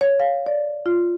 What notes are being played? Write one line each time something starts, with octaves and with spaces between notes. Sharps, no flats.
C#5
F5
D5
F4